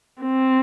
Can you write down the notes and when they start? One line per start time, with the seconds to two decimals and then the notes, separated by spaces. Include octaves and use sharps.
0.23 C4